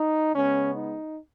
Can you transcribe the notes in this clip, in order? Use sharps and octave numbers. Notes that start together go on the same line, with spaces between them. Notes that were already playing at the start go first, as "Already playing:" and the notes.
Already playing: D#4
C#3 G#3 B3 C#4
D#4